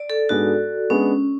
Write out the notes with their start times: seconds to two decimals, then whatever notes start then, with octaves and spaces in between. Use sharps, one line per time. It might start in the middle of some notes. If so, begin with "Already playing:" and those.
Already playing: D5
0.10 A4
0.29 G#2 G#3 B3 D4 F#4 G#4
0.89 G#3 B3 C#4 D4 G#4